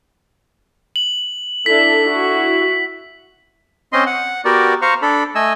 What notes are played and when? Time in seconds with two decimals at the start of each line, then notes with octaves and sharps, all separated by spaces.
0.96 F#7
1.66 D4 E4 A4 B6
2.05 E4 F#4
3.93 C4 C#4 D#5 C6
4.06 F#5
4.45 B3 F#4 G4 A#4 D5
4.82 C5 F5 A#5 C#6
5.02 D4 A4 B5
5.35 A3 D#5 G#5 E6